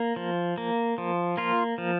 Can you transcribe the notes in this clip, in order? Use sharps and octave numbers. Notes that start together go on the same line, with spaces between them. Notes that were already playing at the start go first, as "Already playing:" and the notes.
Already playing: A#3
F3
A#3
F3
A#3 F4
F3